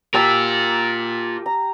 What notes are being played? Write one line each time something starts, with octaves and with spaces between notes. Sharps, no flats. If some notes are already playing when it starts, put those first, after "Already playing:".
F4 G4 A#4 A5 E6
A#5